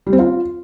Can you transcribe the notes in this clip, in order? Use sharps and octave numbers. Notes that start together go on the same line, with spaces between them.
G3
C4
F4